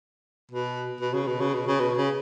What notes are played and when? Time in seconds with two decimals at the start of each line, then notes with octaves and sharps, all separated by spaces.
0.51 B2
1.01 B2
1.13 C#3
1.27 B2
1.40 C#3
1.54 B2
1.67 C#3
1.80 B2
1.98 C#3